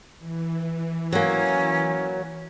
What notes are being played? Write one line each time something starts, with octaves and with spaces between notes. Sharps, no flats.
E3
F#3 A#3 C#4